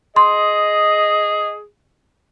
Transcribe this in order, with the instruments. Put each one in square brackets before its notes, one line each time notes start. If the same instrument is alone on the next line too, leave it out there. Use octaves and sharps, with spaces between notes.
[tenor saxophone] G#4 [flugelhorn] D#5 [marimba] C6